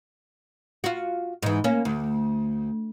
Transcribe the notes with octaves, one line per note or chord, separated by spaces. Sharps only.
F4 F#4
G#2 E3
A#3 C#4
D2